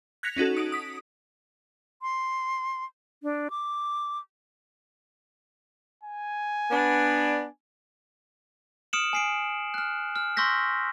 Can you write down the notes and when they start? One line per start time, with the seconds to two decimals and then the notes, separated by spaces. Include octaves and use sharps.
0.23 F#6 G#6 A#6 B6 C#7 F7
0.37 C#4 D#4 F#4 A4
0.57 D#6 D7
0.72 D#6 B6
2.02 C6
3.23 D4
3.50 D6
6.03 G#5
6.71 B3 D4
8.93 D#6 F6 C#7 D7 E7 F#7
9.13 G#5 C7 D7
9.74 F6 F#6
10.16 F6
10.37 C6 C#6 E6 G6 A#6 B6